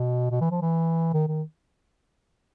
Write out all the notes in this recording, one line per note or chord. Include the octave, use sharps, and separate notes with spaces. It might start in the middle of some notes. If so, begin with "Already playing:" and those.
Already playing: B2
B2
E3
F3
E3
D#3
D#3